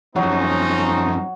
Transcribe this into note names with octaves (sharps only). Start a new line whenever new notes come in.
F#2 F3 F#3 C4 C#4 D#4